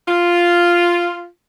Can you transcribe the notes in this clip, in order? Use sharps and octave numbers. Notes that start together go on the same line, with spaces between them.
F4